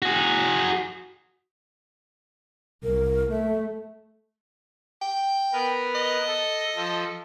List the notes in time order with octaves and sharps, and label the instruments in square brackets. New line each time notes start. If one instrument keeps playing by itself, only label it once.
[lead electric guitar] F#4 G#4
[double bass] C2 [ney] A#4
[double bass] A3 [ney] E5
[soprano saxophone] G5
[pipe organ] B3 A#4 B4
[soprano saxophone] D#5
[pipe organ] A4
F3 A4